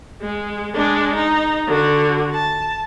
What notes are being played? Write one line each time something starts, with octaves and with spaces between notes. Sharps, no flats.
G#3
G#3 D4
D#4
D3 F#4
A5